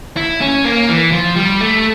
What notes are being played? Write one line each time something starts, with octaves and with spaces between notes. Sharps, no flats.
E4
C#4
A#3
E3
F3
G3
A3